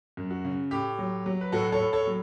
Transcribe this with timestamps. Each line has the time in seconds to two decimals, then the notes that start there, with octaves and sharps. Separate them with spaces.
0.17 F#2
0.31 F#4
0.45 C#3
0.71 A2 G4
0.98 F#3
1.26 F#3
1.41 B4
1.52 A2 F#4 A4
1.72 A4 C#5
1.79 A2
1.93 A4 C#5
2.07 F#3